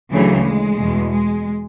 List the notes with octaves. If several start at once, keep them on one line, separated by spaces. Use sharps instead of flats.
D2 C#3 E3 F#3
G#3
E2 B2
G#3